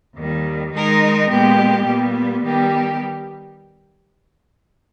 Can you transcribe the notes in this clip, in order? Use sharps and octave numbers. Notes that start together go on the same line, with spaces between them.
D#2 D#3 G3
D#3 G#3 D#4 A#4
A#2 G#3 B3 G4
A#2 G3 B3
D#3 G3 B3 G4